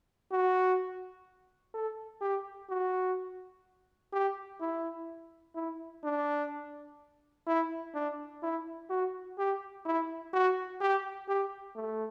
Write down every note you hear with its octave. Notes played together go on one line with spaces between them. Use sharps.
F#4
A4
G4
F#4
G4
E4
E4
D4
E4
D4
E4
F#4
G4
E4
F#4
G4
G4
A3